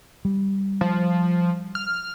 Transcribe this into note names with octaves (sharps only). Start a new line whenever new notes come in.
G3
F3
F6